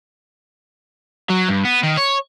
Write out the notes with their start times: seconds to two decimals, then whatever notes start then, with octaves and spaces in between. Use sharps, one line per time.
1.30 F#3
1.48 G2
1.65 B3
1.83 D#3
1.97 C#5